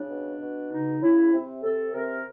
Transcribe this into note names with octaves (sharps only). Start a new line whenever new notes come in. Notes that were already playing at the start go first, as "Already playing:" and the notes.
Already playing: C#3 D4
B2
B2
C#3 D#4
C#3 E4
C3
C3 A4
C3 A#4